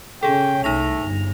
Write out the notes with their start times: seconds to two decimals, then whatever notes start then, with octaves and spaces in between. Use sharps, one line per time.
0.23 C#3 C#4 G#4 A4 G5
0.64 C2 A3 D#4 A#6 F7
1.01 G1